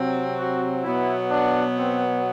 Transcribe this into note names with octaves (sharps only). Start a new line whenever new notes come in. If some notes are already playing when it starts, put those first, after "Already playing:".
Already playing: C3 F#3 C4
F#4
B2 F#3 B3 E4
D4
C4